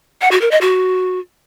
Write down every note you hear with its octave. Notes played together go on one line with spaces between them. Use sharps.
F#5
F#4
A#4
D#5
F#4